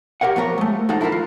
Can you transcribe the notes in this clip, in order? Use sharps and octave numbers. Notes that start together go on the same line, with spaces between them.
G4 A4 A#4 C#5 F#5
F3 B3 A#4 C#5
G#3 A3
D#2 F3 D#4 A4 F#5 A#5
D4 E4 F4 G4 A#4
F4